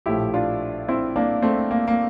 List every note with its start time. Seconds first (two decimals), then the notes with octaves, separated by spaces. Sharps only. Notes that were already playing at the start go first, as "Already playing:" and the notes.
0.06 A#1 A2 F3 E4 G4
0.34 D4 F4
0.88 C4 E4
1.16 A#3 D4
1.42 A3 C4
1.71 A#3
1.88 A#3